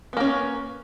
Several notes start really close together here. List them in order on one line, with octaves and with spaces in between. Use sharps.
B3 A#3 C#4